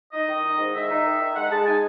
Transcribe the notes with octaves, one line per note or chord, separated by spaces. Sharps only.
D#4 D#5
D#3
D#4
G#2
D#3 E5
D#4
D#3
D#4
G#3 F#5
G#3 A5
D#4 G#5